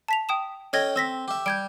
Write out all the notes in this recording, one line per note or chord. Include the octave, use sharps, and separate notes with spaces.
A5 B6 F7
G5 D#6 E7
C#4 A4 D#5 G5 G#6 A#6
C4 E6 A#6 B6
G4 E5
G3 G6 G#6 D7